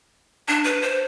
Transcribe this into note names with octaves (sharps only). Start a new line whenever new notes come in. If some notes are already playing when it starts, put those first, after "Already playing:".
D4
B4
C5